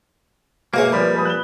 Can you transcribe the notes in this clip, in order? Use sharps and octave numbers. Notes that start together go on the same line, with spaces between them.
B2 G#3 A#3 G#4 C#5 E5 F5
A#2 F3 G3 B4 D5 B5
B4 B5 D#6
F#6 E7 G7